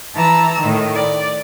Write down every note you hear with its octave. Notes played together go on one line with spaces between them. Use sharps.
E3 A5 A#5 E6
A2 D#3
D5